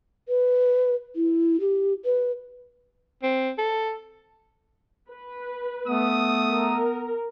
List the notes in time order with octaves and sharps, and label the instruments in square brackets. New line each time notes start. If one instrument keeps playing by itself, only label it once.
[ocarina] B4
E4
G4
B4
[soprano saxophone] C4
A4
[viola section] B4
[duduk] A3 [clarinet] B3 [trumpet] D#6
[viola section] A#4